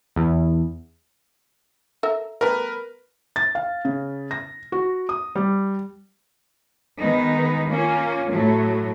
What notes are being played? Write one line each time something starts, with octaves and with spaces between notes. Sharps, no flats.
E2
A4 A#4 E5
G3 A3 B3 A#4 B4
A6
F5
C#3
A#6
F#4
D#6
G3
D#3 G#3 B3 D#4
A#3 C#4 F4
A2 F#3 A3